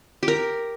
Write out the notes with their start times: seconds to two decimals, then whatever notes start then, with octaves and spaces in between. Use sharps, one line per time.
0.23 G4
0.28 A#4